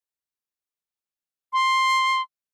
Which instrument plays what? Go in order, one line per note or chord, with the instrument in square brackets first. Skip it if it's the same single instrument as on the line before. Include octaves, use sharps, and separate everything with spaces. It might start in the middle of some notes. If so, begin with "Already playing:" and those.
[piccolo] C6